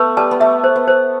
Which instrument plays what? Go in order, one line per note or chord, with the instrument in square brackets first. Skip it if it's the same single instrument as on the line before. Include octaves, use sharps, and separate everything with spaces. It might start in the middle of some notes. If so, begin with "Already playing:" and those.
Already playing: [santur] A3 B3 [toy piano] B4
[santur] G3 [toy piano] A5
[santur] B3
[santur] A3 [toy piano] E5
[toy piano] C5
[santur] B3
[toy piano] C5